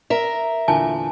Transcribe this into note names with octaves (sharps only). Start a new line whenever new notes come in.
A#4 E5
E2 A#2 D3 G#5 A5